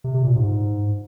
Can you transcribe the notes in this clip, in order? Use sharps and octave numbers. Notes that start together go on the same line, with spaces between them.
C3
C3
A#2
G#2